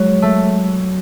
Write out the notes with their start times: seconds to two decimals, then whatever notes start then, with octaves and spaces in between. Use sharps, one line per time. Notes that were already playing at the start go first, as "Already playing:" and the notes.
Already playing: F#3 G#3
0.22 A3